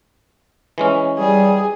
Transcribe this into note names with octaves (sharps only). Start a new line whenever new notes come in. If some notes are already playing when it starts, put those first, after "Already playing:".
E3 G#3 C#4
G3 G#4